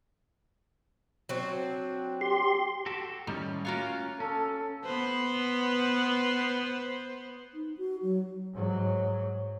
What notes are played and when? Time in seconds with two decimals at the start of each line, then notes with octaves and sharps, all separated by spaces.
1.29 F#3 C4 D4
2.21 G4 C6
2.86 F#4 G4 A4
3.27 A2 D#3 G3 C#4
3.65 A#3 C#4 F4 F#4 C#5 F5
4.20 C#4 A4
4.85 B3 B4 C5
7.54 D#4
7.78 F#4
8.03 F#3
8.54 G#2 F#3